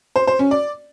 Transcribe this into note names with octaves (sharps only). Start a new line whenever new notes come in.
C5
C5
C#4
D5